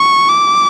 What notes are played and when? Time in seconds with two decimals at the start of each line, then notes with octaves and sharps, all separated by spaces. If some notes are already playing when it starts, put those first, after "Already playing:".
Already playing: C#6
0.29 D6